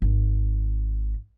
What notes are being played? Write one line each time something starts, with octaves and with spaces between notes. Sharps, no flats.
G#1